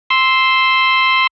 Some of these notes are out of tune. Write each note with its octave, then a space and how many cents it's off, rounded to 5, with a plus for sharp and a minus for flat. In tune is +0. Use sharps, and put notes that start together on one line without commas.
C6 +0 E6 -5